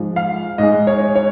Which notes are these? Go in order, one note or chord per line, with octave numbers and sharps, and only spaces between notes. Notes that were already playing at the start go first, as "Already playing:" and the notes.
Already playing: G#2 F3 G#3
F5
G#2 G#3 D#5
C#5
C#5